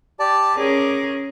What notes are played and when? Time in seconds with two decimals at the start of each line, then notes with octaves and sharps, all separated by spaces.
0.20 G4 D5 A5
0.56 C#4 G#4 A#4 D6